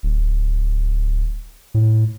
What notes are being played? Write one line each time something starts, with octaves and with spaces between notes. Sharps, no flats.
D1
A2